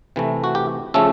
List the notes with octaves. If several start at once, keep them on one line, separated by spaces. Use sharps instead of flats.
C3 E3 A3
F#4
G4
C#3 F3 A3 C#4 A4